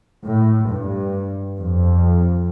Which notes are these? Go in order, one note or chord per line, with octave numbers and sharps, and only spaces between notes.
A2
G2
F2